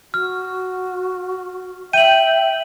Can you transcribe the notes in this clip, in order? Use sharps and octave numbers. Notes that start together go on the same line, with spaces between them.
F#4 F6
E5 G5 D#7 F#7